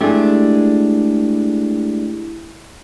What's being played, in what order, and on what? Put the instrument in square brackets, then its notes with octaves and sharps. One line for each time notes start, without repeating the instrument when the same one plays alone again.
[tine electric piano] G#3 A3 G4 [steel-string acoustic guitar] D4 G#4 [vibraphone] E4